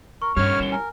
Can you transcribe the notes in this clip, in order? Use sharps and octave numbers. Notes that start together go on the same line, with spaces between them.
A#4 C#6
G2 G3 C#4 D4 C#5 F6
E4 E7 G7
A#4 G#5